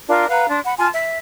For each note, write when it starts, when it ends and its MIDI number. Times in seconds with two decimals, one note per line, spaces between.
0.08 0.27 62
0.08 0.27 65
0.08 0.27 70
0.29 0.47 71
0.29 0.47 77
0.29 0.47 78
0.29 0.47 82
0.48 0.58 62
0.48 0.58 81
0.48 0.58 84
0.65 0.74 78
0.65 0.74 83
0.78 0.88 65
0.78 0.88 80
0.78 0.88 81
0.78 0.88 84
0.95 1.19 76